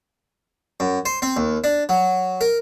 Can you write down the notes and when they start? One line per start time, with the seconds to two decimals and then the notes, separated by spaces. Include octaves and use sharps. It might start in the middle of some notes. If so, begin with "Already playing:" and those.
0.80 F#2
1.05 C5
1.22 C4
1.36 D#2
1.64 D4
1.89 F#3
2.41 A#4